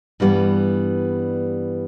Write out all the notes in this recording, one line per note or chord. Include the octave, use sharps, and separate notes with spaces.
G2 E3 G3 B3